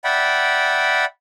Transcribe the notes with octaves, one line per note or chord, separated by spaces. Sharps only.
D5 E5 F#5 G5 B5